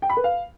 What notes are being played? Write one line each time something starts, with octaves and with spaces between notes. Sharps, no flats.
G5
B5
B4
F5